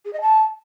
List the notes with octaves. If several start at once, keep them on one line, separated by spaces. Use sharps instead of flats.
G#4
D#5
A5